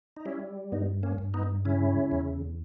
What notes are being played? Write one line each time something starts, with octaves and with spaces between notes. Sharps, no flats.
D#4
G3 C#4 E4
G2 B3 D#4
A#3 C#4
G2
B3 D#4
C#3 C#4 E4
E2